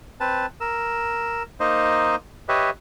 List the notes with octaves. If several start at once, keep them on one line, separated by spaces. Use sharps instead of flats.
C4 B4 A5
A#4 E6
A#3 D#4 C5 D#5
G4 B4 C#5 D#5 E5